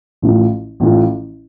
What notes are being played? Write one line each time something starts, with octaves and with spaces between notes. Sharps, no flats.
A1 A2 F3
A1 A2 F3